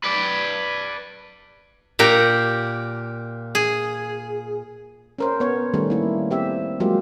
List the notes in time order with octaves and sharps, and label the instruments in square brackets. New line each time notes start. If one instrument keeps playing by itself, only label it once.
[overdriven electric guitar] B4 D5
[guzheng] A#2 G4 A#5
G#4
[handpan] C#4 A#4 C5
B3 C#5
D#3 G3 A3 C#4
A#3 E4
C4 G4 E5
F#3 G#3 A#3 F4 G4